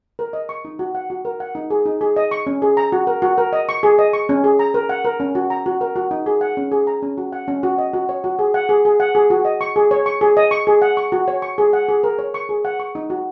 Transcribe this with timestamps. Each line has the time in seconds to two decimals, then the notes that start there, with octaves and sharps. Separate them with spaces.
0.19 A#4
0.33 D#5
0.49 C#6
0.65 D#4
0.79 F#4
0.95 F#5
1.10 F#4
1.25 A#4
1.40 F#5
1.55 D#4
1.70 G#4
1.85 D#4
2.01 G#4
2.16 D#5
2.31 C#6
2.47 C#4
2.62 G#4
2.77 A#5
2.92 F#4
3.07 A#4
3.22 F#4
3.38 A#4
3.53 D#5
3.69 C#6
3.83 G#4
3.99 D#5
4.13 C#6
4.29 C#4
4.44 G#4
4.59 A#5
4.74 A#4
4.89 F#5
5.04 A#4
5.20 C#4
5.35 F#4
5.50 A#5
5.66 F#4
5.81 A#4
5.96 F#4
6.11 D#4
6.26 G#4
6.41 F#5
6.57 C#4
6.72 G#4
6.87 A#5
7.02 C#4
7.18 F#4
7.33 F#5
7.48 C#4
7.63 F#4
7.78 D#5
7.93 F#4
8.09 C#5
8.24 F#4
8.39 G#4
8.54 F#5
8.69 G#4
8.85 G#4
9.00 F#5
9.15 G#4
9.30 F#4
9.45 D#5
9.61 C#6
9.76 G#4
9.91 C#5
10.06 C#6
10.21 G#4
10.37 D#5
10.51 C#6
10.67 G#4
10.82 F#5
10.97 C#6
11.12 F#4
11.28 C#5
11.42 C#6
11.58 G#4
11.73 F#5
11.89 G#4
12.04 A#4
12.19 C#5
12.34 C#6
12.49 G#4
12.65 F#5
12.80 C#6
12.95 D#4
13.10 F#4